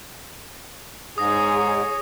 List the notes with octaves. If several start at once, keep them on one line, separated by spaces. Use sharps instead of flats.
G#2 G#4 C#5 D#6 A#6